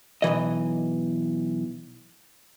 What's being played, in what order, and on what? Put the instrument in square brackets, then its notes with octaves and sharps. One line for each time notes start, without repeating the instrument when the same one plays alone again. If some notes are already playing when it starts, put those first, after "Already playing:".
[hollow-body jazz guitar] B1 E2 E3 D#5